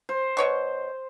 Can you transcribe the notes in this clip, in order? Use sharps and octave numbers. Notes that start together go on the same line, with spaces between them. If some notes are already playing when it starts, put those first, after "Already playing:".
C5
B2 C#5 C#6